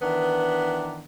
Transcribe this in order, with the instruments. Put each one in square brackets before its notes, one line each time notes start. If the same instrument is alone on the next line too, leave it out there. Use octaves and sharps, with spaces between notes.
[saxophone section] D#3 E3 B3 D4